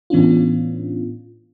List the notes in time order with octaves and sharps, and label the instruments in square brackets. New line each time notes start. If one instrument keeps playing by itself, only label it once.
[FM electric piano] A2 E3 B3 C#4 D4 F4